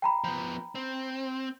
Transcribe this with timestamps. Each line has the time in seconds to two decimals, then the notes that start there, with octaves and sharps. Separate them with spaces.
0.02 G5 A#5 B5
0.24 F3 B3
0.75 C4